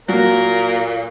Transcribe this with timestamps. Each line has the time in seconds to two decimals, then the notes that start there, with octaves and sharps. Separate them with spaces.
0.08 A#2 F#3 A#3 A#4